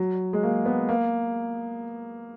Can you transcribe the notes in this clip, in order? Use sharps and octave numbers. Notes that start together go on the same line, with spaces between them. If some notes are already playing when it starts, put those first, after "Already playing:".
Already playing: F#3
G#3
A#3
B3
A#3